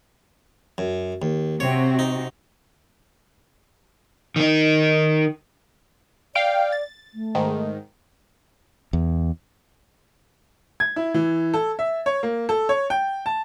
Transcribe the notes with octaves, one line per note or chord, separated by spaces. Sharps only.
F#2
D#2
C3 C4 F#4 C#5
D#4
D#3 D#4
D5 F5 G5 D7
A6
A3
G#2 D#3
E2
G#6
E4
E3
A4
E5
C#5
A#3
A4
C#5
G5
A5